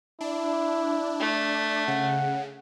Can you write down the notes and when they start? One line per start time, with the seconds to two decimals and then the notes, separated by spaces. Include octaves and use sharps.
0.21 D4 E4
1.19 A3
1.88 C#3 F#5